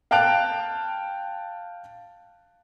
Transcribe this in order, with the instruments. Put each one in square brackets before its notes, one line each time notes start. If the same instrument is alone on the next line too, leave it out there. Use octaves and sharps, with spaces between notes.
[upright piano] F5 G5 A5 F#6 D7 F7